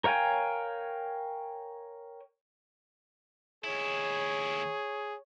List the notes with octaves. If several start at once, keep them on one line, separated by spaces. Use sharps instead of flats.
A#4 C#5 F5 G5 G#5
D#2 E4 G#4 C#5